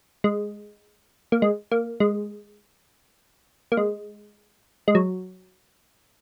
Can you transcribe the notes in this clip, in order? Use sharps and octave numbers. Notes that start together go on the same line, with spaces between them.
G#3
A#3
G#3
A#3
G#3
A#3
G#3
G#3
F#3